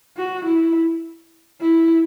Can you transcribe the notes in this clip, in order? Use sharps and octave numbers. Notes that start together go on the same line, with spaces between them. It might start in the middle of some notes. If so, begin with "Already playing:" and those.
F#4
E4
E4